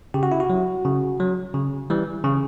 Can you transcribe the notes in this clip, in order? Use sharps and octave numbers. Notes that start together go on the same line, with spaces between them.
C#3 G4
F#4
E4
F#4
F#3
C#3
F#3
C#3
E3 G3
C#3